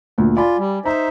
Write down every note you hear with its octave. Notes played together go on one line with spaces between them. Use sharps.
D2 A#2
F4 D5 G#5 B5
G3
D#4 C5 E5 A#5